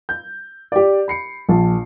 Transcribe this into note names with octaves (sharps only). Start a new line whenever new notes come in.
G6
G4 D5
B5 C7 C#7
A#1 A5